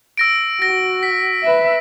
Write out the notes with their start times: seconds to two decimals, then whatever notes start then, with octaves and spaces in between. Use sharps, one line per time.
0.17 E6 A#6 D7
0.62 F#4 A#6
1.03 B6
1.43 B4 E5